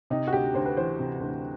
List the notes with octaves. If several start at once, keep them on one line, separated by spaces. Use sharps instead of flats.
C3 D#4
F#4
D2 G4
D2 C5
B4
E3 C5
C3
D2